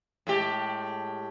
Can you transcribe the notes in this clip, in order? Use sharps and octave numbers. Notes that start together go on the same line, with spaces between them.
A2 G#3 G4